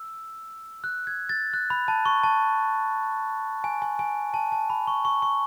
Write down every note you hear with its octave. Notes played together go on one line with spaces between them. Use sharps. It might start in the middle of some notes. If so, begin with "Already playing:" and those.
Already playing: E6
F#6
G#6
A6
F#6
B5
A5
C#6
A5
G#5
G#5
G#5
A5
A5
B5
C#6
C#6
C#6